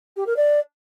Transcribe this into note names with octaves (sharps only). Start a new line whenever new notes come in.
G4
A#4
D5